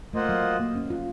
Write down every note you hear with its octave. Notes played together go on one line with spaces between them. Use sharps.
A3 A#3 F4 C5 D#5 F#5
F#3
A3
A#3
C#4
F4